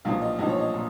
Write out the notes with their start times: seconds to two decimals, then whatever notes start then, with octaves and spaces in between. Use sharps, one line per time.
0.05 B1 A#2 F3 F5
0.22 D#5
0.39 B1 A#2 F3 D#5
0.49 C#5
0.59 D#5
0.74 A#2